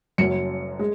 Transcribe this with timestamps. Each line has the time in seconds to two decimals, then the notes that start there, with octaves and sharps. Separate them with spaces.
0.18 F#1 F#2 F#3 C#4 C#7
0.79 G#3